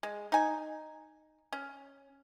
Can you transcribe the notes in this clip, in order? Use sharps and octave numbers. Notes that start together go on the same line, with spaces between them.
G#3
D#4 G#5
C#4